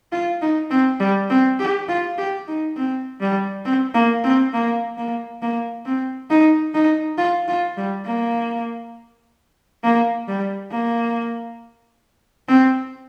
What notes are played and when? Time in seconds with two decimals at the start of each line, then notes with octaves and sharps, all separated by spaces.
0.12 F4
0.42 D#4
0.71 C4
1.00 G3
1.30 C4
1.60 G4
1.88 F4
2.18 G4
2.48 D#4
2.77 C4
3.21 G3
3.65 C4
3.95 A#3
4.24 C4
4.53 A#3
4.97 A#3
5.42 A#3
5.86 C4
6.30 D#4
6.74 D#4
7.18 F4
7.48 F4
7.78 G3
8.07 A#3
9.84 A#3
10.28 G3
10.72 A#3
12.49 C4